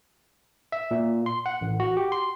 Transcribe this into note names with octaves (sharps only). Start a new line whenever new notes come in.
E5
A#2
C6
F#5
A1
F#4
G4
C6